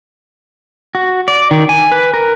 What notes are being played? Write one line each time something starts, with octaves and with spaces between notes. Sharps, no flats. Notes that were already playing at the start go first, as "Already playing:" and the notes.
F#4
D5
D#3
G#5
B4
A#4